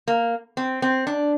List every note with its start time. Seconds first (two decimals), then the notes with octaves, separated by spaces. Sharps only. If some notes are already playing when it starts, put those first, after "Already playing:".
0.08 A#3
0.57 C4
0.82 C4
1.07 D4